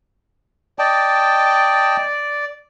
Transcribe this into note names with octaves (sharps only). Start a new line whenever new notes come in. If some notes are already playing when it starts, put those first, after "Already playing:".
D5 D#5 G5 A5